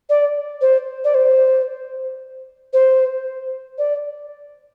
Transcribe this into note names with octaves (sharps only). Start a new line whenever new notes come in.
D5
C5
D5
C5
C5
D5